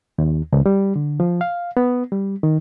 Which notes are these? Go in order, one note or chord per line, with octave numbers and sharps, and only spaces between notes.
D#2
C#2
G3
D3
F3
F5
B3
G3
D#3